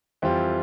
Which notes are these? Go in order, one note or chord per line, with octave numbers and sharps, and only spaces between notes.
F2 E3 G3 C4 F4